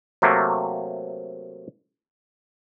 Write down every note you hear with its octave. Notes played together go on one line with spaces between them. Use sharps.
C3 F#3 A3 A#3